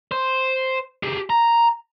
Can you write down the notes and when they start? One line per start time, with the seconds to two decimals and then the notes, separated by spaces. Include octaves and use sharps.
0.11 C5
1.03 G4 G#4
1.30 A#5